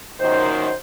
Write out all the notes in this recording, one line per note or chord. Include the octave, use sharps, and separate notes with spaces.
F#2 A#2 D#3 C5